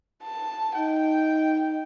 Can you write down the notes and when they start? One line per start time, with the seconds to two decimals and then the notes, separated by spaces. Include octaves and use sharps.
0.23 A5
0.76 D#4 G5